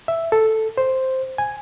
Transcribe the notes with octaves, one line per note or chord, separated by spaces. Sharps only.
E5
A4
C5
G#5